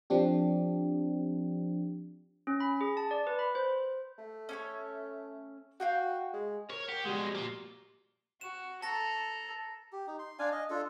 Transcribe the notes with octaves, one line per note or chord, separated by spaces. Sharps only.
F3 C4 D4 G4
C#4
B5
G#4
A5
D5
B4
B5
C5
A3
C#4 A4 C#5
F#4 F5 G5 C#6
G#3
A#4 C#5
G4 F#5
B2 G3 G#3 F#4
A#3 F4
F#4 E7
A4 A5 A#5 A#6
G4
D#4
C6
D4 D5 F5 G#5
D#5
D4 F4 A4